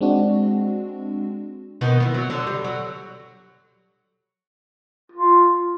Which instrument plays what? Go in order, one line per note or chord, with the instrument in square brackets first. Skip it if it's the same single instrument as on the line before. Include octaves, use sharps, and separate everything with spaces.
[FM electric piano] G#3 C4 D4 F#4
[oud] B2 D#3 B3
E3 B3
F#3
D3
G3
F#3
[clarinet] F4